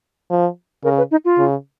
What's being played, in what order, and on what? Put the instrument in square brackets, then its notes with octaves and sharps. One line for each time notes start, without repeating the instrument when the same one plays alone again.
[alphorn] F3
[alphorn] C#3 [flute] A#4
[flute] B4
D#4
F4
[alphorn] C#3